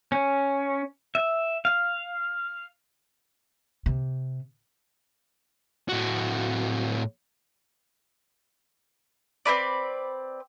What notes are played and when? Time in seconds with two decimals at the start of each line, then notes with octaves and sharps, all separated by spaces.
0.12 C#4
1.15 E5
1.65 F5
3.86 C3
5.89 A2 F#4
9.46 C4 C#4 B4 D5